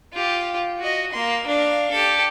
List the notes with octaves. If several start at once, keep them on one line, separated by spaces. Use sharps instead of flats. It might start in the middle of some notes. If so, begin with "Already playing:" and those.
F4 G4
F#4 D#5
A#3 C6
D4 F5
G4 A4